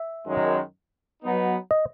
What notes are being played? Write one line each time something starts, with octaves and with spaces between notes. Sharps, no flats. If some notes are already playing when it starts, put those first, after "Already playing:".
Already playing: E5
F#2 D#3 G#3
F#3 B3 D#4
D#5